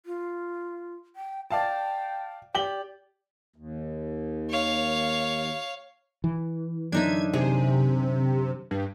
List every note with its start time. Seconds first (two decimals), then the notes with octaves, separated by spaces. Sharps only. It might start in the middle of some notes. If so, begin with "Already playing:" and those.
0.06 F4
1.16 G5
1.51 D5 F5 G5 A5
2.55 G4 D5 F#7 G7
3.56 D#2
4.50 C#5 F5
6.24 E3
6.92 F#2 D3 D4 D#4 E5 G#6
7.33 C3 G#4
8.71 G2